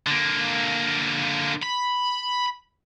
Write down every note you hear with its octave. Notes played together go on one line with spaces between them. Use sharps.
D3 A#3
B5